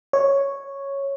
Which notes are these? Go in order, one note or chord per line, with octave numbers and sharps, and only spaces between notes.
C#5